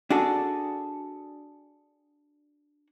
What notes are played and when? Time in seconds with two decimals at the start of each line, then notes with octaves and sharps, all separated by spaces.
0.10 D4 F#4 G#4 A4